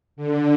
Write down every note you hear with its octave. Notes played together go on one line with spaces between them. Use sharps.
D3